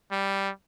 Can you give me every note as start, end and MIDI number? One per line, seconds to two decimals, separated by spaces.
0.12 0.50 55